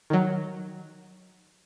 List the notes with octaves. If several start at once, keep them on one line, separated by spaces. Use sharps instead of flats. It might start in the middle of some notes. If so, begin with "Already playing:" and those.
D#3 F#3